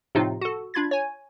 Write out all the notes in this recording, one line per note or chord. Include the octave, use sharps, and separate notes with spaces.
A2 C3 F3 D#4 F4
F#4 A4
D4 F4 B5 G#6 A6
C#5 G#5